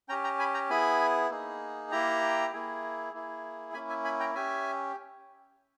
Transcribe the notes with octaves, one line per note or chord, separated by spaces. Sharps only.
C#4 G4 G5 A#5
G5 A#5
G#5 B5
G5 A#5
B3 E4 G#4 G#5 B5
A#3 D#4 G#4
A#3 E4 G4 G5 A#5
A#3 E4 G#4
A#3 E4 G#4
A#3 C#4 E4 G#5 B5
E5 G#5
G#5 B5
G5 A#5
C#4 G4 E5 G#5